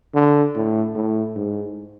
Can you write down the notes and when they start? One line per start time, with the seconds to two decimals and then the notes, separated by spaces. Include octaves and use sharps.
0.15 D3
0.55 A2
0.95 A2
1.36 G#2